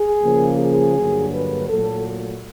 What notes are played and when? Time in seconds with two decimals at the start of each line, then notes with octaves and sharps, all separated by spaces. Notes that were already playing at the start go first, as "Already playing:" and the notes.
Already playing: G#4
0.22 C#3 F3 A#3
0.60 G#4
0.96 G2 D3 F#3 A#3
1.33 B4
1.70 A#2 F#3 A3 A4